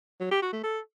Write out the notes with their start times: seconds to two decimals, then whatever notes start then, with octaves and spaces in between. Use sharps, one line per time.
0.20 F#3
0.31 G4
0.42 F#4
0.53 A3
0.63 A4